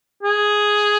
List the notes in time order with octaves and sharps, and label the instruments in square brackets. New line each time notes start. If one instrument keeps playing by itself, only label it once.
[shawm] G#4